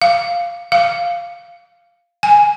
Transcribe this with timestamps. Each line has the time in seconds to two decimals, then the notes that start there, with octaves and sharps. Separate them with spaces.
0.02 F5
0.72 F5
2.23 G#5